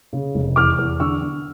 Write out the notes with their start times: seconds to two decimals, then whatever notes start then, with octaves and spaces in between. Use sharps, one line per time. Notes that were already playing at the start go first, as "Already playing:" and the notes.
0.13 C#3
0.35 F1
0.56 E2 D6 F6
0.78 E2
1.00 D3 C#6 E6
1.22 D3